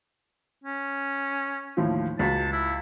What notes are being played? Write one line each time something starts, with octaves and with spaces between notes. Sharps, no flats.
C#4
D#2 A2 F3
C#2 F#4 A5 B6
E4